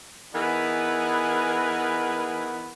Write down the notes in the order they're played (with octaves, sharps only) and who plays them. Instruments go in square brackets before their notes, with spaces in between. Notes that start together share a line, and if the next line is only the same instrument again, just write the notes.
[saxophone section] E3 B3 D#4 G#4 A#4 B4